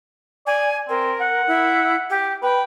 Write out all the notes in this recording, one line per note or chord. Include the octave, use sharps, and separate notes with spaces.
D5 G#5
C4 A#4
F#5
E4
G4
B4 G5